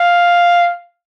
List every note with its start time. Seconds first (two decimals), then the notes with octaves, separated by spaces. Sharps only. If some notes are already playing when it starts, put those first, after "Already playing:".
Already playing: F5